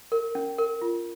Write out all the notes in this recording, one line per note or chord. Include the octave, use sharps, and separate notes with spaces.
A#4
C#4
A#4
F4